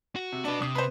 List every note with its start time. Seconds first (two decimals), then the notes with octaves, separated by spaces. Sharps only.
0.16 F#4
0.32 C3
0.45 D4 F#4 B4
0.62 C3 D#6
0.75 B4 C5